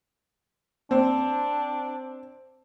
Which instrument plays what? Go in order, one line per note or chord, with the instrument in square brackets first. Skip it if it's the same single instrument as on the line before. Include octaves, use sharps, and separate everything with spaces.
[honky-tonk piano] C4 [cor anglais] D4